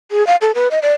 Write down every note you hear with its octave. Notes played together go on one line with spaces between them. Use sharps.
G#4
F5
A4
B4
D#5
D5